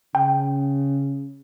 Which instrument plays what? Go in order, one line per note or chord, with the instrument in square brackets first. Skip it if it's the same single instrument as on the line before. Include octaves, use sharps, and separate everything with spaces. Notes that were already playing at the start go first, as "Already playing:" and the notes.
[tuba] C#3 [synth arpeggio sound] G5